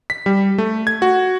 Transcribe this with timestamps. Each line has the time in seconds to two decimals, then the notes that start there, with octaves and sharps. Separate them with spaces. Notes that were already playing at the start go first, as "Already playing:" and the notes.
0.10 B6
0.26 G3
0.58 A3
0.87 G#6
1.02 F#4